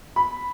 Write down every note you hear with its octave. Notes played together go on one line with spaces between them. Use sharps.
B5